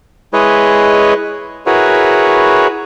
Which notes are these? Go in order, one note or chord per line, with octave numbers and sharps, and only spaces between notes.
G#3 E4 G#4 B4 C#5 D#5
E4 F#4 G#4 A#4 B4 C#5